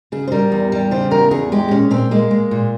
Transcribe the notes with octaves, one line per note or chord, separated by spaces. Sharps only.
C#3 G#4
C5
G3 A#4
E2
G3
C#3 C5
E2 A#4
E2 G#4
G#3 G4
A#2 C#4
A#2 C4
G#3 A#3
G#3
A#2